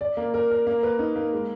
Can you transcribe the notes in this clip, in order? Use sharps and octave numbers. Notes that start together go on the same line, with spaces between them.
D5
A#3
A#4
A#4
A#3
B4
D#4
A#3
G#3